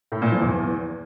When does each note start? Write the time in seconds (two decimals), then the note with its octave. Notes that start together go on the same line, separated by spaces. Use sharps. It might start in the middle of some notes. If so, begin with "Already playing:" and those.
0.12 A2
0.22 A#2
0.32 F3
0.42 E2